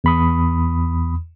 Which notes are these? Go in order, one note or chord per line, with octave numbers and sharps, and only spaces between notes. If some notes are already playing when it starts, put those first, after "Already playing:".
E2 B5 D#6